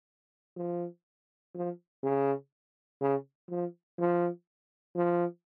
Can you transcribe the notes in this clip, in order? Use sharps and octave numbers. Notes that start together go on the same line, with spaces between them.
F3
F3
C#3
C#3
F3
F3
F3